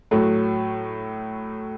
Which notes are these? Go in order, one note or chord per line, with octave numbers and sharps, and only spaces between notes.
A2 F#3 A3